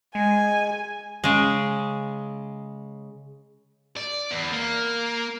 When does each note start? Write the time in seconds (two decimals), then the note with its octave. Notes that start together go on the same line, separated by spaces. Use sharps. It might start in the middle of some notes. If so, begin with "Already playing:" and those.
0.15 G#3 G#5
1.24 C#3 G#3
3.97 D5
4.31 E2
4.52 A#3